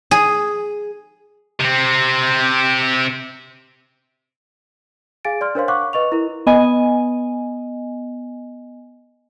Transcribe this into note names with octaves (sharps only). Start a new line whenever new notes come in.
G#4
C3 C4
G#4 F5 G#5 A6 D7
D5 C6 F6
D4 A#4 C5 C#5 F5 C6
F5 F#5 C#6 D6 F#6
B4 D#5 C#6 F7
E4 A#4
B3 D#5 G#5